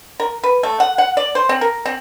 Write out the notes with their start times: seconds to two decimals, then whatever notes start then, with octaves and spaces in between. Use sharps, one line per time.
0.20 A#4
0.44 B4
0.63 A3
0.80 F#5
0.98 F#5
1.17 D5
1.35 C5
1.49 C4
1.61 A#4
1.86 C4